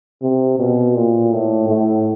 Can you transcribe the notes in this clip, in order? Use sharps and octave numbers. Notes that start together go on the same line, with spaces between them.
C3
B2
A#2
A2
A2